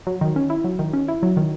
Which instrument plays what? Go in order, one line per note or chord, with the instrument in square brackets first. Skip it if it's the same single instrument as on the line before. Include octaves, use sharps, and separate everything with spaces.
[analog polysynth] F#3
D#3
C#4
E4
F#3
D#3
C#4
E4
F#3
D#3